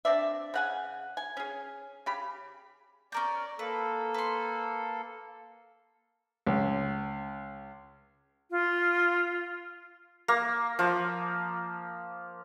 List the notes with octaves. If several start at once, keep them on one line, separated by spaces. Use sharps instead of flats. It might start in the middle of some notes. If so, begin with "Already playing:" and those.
C4 D4 D5 E5
C#3 F#5 G#5
G#5
C#4 G#4
C#3 G4 B5
C#4 A#4 D5 G6
A#3 A4 B4
B4 C6
C#2
F4
A#3
F3